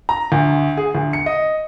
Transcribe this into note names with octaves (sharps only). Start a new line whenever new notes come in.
A#5
D2
G#4
D2
C#7
D#5